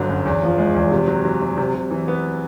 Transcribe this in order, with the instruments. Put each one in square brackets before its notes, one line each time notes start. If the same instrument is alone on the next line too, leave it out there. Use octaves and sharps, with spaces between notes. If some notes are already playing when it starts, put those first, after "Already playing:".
Already playing: [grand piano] G1 D3 F#3 B3
F#2
E2
F3
G#3
E2
C3
F#3
F#3
F#3
C3
C3
E3
B3